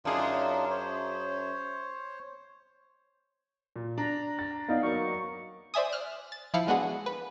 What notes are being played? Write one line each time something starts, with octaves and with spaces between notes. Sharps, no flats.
F#2 D4 D#4 F4 G#4
C5 C#5
A#2
D4 A#5
A6
B3 D#4 D5 F5
F#3 A#3 C#6
C5 D5 E5 G#5 D#6
F6 F#6
A6
F3 E4 F5 C#7
G#3 B3 D4 F#4 G#4
B4